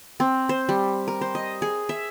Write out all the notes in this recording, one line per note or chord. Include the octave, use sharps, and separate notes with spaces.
C4
C5
G3
A#4
C5
D#5
G#4
E5